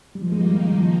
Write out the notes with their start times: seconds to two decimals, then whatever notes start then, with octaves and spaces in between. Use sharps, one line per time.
0.15 G3
0.22 D#3 F3 A#3 D#4
0.32 G#3
0.41 G3
0.79 F3